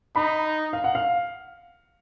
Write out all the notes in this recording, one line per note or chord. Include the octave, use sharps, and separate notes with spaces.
D#4 B5
F5
F#5
F5